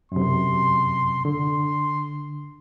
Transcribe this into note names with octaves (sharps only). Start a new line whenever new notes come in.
F#2 C3 C6
D3 C6